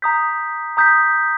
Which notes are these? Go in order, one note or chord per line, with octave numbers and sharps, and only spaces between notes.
A#5 D#6 G6 B6
A#5 D#6 G6 B6